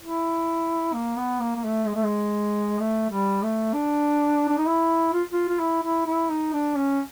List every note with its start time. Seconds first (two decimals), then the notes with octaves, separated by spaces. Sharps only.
0.01 E4
0.93 A#3
1.16 B3
1.40 A#3
1.55 A#3
1.64 A3
1.86 G#3
1.95 A3
2.04 G#3
2.79 A3
3.10 G3
3.42 A3
3.73 D4
4.49 D4
4.58 D#4
4.66 E4
5.13 F4
5.32 F4
5.49 F4
5.59 E4
5.83 E4
6.06 E4
6.30 D#4
6.53 D4
6.76 C#4